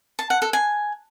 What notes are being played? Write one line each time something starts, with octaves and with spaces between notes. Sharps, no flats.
A5
F#5
A4
G#5